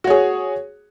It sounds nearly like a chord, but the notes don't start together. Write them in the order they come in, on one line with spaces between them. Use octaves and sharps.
F#4 C#5 G#4